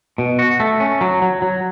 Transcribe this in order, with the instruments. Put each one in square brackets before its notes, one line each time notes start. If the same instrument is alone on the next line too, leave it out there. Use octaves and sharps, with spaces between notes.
[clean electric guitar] B2
F#4
A3
C#4
F#3
F#3
F#3